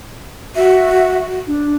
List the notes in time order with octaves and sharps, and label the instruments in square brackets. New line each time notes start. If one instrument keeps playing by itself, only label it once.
[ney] F#4 [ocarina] E5
[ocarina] D4